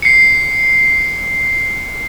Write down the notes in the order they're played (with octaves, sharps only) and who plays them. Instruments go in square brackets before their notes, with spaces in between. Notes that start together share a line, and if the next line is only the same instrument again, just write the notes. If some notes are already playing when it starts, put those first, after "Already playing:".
[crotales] C7 C#7